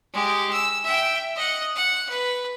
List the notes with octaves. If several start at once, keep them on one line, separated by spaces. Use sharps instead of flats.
G#3 G4
E6
E5 G5
D#5 F#5
F#5
B4